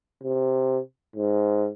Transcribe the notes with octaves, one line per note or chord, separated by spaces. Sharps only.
C3
G#2